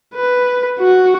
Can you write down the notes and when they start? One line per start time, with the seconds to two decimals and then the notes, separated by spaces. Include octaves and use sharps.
0.15 B4
0.80 F#4